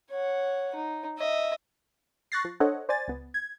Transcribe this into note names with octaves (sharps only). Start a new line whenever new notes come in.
C#5 F#5
D#4
D#5 E5
C#6 F#6 A6 A#6 C7
F3
D4 A4 C5 C#5 D#5 F#5
C5 D5 G#5 A6
C#2 B3
G#6